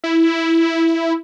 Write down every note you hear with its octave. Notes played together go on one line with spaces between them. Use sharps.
E4